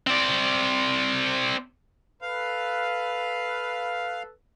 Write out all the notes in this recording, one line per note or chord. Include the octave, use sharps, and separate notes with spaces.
C4 D5
A4 B4 F5